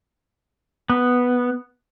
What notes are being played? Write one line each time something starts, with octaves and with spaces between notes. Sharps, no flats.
B3